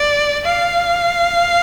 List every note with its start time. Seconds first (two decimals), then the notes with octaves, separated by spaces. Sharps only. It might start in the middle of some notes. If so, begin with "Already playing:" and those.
Already playing: D5
0.45 F5